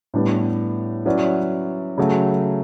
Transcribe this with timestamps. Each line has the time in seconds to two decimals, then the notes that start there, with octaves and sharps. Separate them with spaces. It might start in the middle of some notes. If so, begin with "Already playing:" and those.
0.14 A2 G3 B3 D4
1.05 F#3 C#4 E4 B4 D5
1.98 C#3 F#3 A3